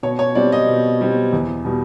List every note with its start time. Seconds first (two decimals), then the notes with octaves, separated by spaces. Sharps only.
0.03 B2 C#5
0.19 C#5
0.35 G3 C4 D5
0.52 D#5
0.69 B2
1.01 G3 C4
1.33 E2
1.65 B2 G3